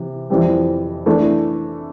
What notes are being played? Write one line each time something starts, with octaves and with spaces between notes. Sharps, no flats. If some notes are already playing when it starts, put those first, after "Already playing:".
Already playing: C3 E3
F2 E3 G3 C4
E3 A3 D4